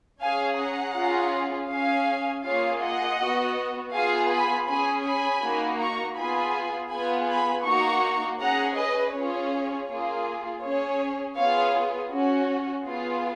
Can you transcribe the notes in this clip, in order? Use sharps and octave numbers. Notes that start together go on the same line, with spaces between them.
C#4 G#4 F5 G#5
F#5 A#5
C#4 F4 G#4
C#4 G#4 F5 G#5
A#3 F4 G#4 C#5 F5
D#5 F#5
B3 F#4
B3 F4 G#4 F5 G#5
G#5 B5
C#4 G#4 G#5 B5
G#5 B5
A#3 D#4 F#4
A#5 C#6
B3 F4 G#4 G#5 B5
B3 F4 G#4 G#5 B5
G#5 B5
A#3 D#4 F#4 A#5 C#6
C#4 G#4 F#5 A#5
B4 D#5
C#4 F4 G#4 C#5
A#3 F4 G#4
C#4 G#4 C#5
B3 F4 G#4 C#5 F5
C#4 F#4
B3 F4 G#4